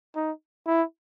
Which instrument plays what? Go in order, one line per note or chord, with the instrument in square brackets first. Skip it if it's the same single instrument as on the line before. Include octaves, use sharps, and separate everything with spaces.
[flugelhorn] D#4
E4